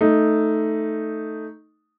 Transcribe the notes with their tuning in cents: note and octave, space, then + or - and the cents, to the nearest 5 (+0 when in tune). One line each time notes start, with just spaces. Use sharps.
A3 +0 D#4 +0